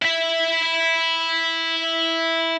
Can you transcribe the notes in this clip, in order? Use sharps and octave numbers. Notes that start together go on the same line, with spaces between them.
E4 E5